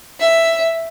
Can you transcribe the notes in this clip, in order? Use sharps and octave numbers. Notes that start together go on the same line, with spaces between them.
E5